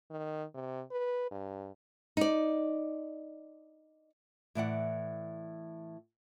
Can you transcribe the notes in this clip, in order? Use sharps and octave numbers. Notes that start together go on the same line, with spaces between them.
D#3
C3
B4
G2
D#4 D5
A2 E3 D5 F#5